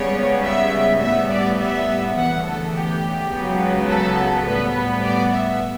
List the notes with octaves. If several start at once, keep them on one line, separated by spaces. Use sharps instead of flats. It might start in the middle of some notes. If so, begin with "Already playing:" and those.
Already playing: C#2 C#3 G3 B3 C#5
E5
A2 G3 B3 E5
D5
E5
D2 C#3 E3 B3 F#5
A4
G4
C#2 C#3 F#3 B3
A4
A2 G3 B3 B4
B4
D5
E5